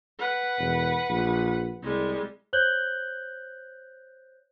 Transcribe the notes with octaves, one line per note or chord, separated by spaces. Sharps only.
B4 F#5
E1
A#1
C2 G3 G#3
C5 C#5 F#6 G6 F#7 G7